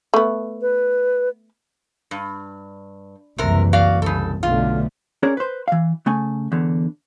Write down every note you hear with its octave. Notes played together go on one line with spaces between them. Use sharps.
A3 B3
B4
G2
F#1 C2 C3 E3 A#4
F#4 D5 F5
C2 C#3 A4
B1 D3 A3 F4
C#4 G#4 A#4 C#5 D5
B4 C5
E3 F5
C#3 A3 G#5
E2 D3